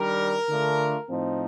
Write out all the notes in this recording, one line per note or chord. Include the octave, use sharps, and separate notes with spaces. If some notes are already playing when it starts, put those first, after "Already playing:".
Already playing: D#3 G3 D4 A#4
D3 A3 D4 F4
A2 F3 C4 D#4